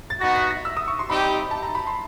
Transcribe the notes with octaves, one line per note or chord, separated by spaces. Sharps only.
A6
B3 D#4 F#4 A#6
B6
A#6
E6
D#6
C#6
C6
G3 C4 D#4 G4 B5
A5
A#5
B5
C6